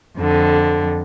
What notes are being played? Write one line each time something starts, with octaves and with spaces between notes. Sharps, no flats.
F2 D3